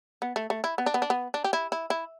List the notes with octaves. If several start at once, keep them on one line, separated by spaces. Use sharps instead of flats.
B3
A3
A3
E4
B3
D4
B3
D4
B3
D4
G4
E4
E4
E4